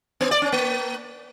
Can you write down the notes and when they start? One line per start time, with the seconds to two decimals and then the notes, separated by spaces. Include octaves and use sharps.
0.21 B3
0.31 D5
0.42 C#4
0.52 A#3